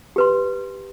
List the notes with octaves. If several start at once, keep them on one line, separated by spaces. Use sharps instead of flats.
G4 B4 C6